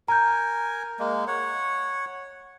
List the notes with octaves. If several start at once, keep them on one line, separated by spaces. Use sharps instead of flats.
A#4 G#5 A#5 G6
G#3 A#3
C#5 F#5